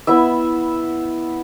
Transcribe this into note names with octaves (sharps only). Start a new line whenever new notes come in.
B3 E4 E5